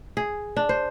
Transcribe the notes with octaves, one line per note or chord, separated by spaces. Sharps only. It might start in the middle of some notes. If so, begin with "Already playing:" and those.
G#4
D4
C5